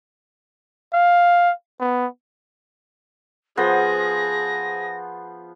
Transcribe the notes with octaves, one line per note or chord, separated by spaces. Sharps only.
F5
B3
F3 B3 G#4 C5 A#6